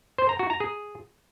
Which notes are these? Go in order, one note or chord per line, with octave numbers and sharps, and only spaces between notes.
C5
A#5
F#4
A#5
G#4